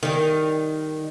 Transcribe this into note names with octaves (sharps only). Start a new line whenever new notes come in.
D#3 G3